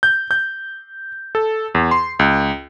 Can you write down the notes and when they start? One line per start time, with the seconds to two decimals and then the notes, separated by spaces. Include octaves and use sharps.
0.03 G6
0.31 G6
1.35 A4
1.75 E2
1.91 C6
2.19 C#2